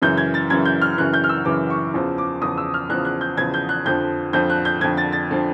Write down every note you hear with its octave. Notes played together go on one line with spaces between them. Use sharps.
F#2 C#3 E3 G6
G#6
A6
F#2 C#3 E3 G#6
G6
F6
F#2 C#3 E3 F#6
G6
F6
E6
F#2 C#3 E3 D6
C#6
E2 C#3 F3
D6
E2 C#3 F3 D#6
E6
F6
E2 C#3 F3 F#6
F#6
G6
E2 C#3 F3 G#6
G6
F#6
F2 D3 F3 G6
F2 D3 F3 G6
F#6
G6
F2 D3 F3 G#6
A6
A6
D3 F3